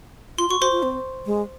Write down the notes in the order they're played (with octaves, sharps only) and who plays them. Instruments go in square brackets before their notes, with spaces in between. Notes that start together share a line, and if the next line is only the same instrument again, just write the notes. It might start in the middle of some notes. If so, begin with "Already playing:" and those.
[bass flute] F4 [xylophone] C6
[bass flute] F#4 [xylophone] C#6
[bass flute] F#4 [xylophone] C5 C6
[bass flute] F4
C4
G#3